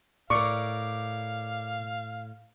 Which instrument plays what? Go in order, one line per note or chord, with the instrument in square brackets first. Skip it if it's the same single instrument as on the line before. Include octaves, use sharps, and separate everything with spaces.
[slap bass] A2 [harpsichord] A#4 D5 [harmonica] F5 [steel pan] C#6